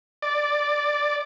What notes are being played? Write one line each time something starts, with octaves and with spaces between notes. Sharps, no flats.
D5